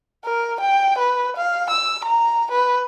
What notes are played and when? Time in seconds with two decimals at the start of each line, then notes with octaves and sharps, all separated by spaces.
0.24 A#4
0.61 G5
0.99 B4
1.37 F5
1.70 E6
2.05 A#5
2.52 B4